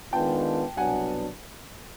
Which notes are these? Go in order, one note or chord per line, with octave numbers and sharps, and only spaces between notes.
D#3 G#3 B3 D4 F4 G5 A5
C2 B2 F#3 B3 D4 F#5 G#5